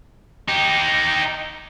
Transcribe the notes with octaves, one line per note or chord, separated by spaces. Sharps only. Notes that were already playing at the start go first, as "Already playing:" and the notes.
D#4 G4